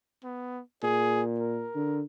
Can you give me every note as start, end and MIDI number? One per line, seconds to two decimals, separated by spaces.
0.24 0.61 59
0.83 1.67 46
0.83 1.23 68
1.40 2.01 70
1.75 2.02 50